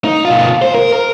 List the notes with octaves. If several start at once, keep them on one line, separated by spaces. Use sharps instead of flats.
D#4
B2 F4
C5
A#4
A#4